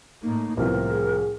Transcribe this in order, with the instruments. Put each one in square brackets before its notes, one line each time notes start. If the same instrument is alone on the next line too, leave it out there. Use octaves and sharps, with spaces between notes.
[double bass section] A2 A#3 [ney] D#4
[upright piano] C2 C3 F3 [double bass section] A2 [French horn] B3 [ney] A#4
[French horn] G#4